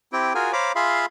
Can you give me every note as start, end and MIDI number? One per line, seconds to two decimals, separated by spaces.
0.13 0.33 60
0.13 0.33 64
0.13 0.33 67
0.13 0.33 79
0.35 0.52 65
0.35 0.52 66
0.35 0.52 68
0.35 0.52 70
0.35 0.52 80
0.53 0.72 72
0.53 0.72 73
0.53 0.72 77
0.53 0.72 82
0.53 0.72 83
0.53 0.72 86
0.75 1.06 65
0.75 1.06 68
0.75 1.06 76
0.75 1.06 77
0.75 1.06 83
0.75 1.06 84